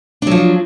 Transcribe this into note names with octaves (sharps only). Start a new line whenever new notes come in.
F3 F#3 D4